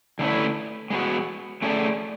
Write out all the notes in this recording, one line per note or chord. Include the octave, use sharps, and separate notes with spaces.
D3 A3 C#4 E4 B4
G#3 B3 F#4
A3 C#4 G#4 D5